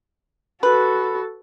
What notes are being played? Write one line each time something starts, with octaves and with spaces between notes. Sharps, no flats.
F#4 A4 B4